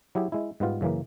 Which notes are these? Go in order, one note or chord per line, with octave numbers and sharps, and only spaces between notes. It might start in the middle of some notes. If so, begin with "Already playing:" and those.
F#3 E4 G4 G#4
G#3 E4
G#2 G3 B3 F4
F#2 C#3 E3 A#3